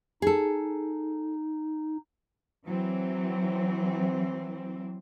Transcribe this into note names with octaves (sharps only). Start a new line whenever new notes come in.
D#4 G#4 A4
E3 F#3 C4